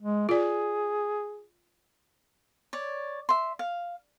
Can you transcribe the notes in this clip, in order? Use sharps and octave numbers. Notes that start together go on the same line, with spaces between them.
G#3
F4 G#4 D5
C#5 D5
E5 C6
F5